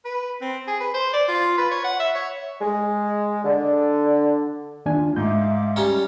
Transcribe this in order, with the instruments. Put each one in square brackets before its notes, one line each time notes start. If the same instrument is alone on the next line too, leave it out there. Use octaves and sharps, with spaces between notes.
[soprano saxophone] B4
C4
G#4
B4
C5
D5
F4
B4
C#5
F#5
E5
C#5
[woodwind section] G#3
D3
[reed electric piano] D#2 D4 G#5 [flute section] F4
[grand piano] G#2 [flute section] E5 F5 D6 [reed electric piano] G6
[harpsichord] G3 C#4 [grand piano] A#5